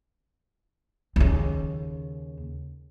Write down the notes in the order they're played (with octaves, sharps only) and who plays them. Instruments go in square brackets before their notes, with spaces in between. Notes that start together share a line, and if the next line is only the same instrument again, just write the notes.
[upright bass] D#2 C#3